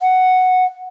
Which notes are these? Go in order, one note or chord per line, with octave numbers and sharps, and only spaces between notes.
F#5